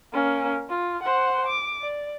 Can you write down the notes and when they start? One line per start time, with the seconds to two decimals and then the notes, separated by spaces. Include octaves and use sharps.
0.13 A#3 C#4
0.70 F4
1.03 C5 F#5
1.47 D6
1.81 D5